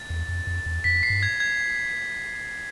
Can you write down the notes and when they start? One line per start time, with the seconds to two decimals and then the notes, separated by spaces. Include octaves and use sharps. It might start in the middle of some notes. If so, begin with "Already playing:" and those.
Already playing: A6
0.10 E2
0.28 F2
0.47 F2
0.66 E2
0.84 F2 B6
1.03 C7
1.10 G2
1.23 G#6
1.40 G#6